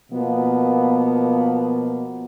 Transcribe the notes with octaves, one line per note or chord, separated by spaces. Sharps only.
B2 F3 A#3 B3